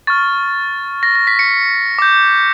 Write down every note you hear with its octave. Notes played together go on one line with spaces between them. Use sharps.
C#6 F6 A6
A#6
A#6
B6
C#7
D6 G6